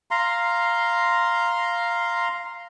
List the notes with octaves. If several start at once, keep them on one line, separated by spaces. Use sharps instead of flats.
F5 A#5 C6